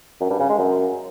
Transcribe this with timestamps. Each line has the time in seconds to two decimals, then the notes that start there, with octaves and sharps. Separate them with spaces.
0.21 F#2
0.30 G2
0.40 C#3
0.49 G#3
0.58 F#2